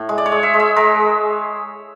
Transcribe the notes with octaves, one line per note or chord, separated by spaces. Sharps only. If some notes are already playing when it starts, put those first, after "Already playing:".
Already playing: A2
G#3
D5
C#5
G#3
E5
G#3
E5
G#3 A#4